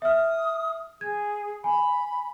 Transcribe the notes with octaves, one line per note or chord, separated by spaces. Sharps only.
E5 D#6 F6
G#4 G#6
G#5 B5